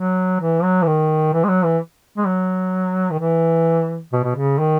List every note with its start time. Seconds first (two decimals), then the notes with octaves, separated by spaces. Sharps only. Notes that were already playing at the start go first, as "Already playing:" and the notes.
Already playing: F#3
0.40 E3
0.63 F#3
0.82 E3
0.87 D#3
1.33 E3
1.44 G#3
1.49 F#3
1.64 E3
2.17 G#3
2.26 F#3
3.11 D#3
3.19 E3
4.13 B2
4.24 B2
4.36 C#3
4.59 D#3